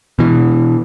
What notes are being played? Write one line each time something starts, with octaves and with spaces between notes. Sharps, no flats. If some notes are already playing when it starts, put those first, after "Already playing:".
B2 E3